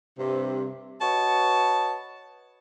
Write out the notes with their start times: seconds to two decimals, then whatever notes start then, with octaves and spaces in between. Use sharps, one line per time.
0.19 G2 C3
1.01 F#4 B4 C#5 D#5 A5